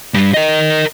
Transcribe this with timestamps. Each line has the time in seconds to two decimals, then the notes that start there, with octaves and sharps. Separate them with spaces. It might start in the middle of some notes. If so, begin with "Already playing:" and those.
0.14 G2 G3
0.34 A#4 D#5